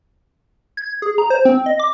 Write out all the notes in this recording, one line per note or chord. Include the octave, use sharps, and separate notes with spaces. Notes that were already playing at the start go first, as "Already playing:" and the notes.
G#6
G#4
A#5
C5
C4
D#5
D6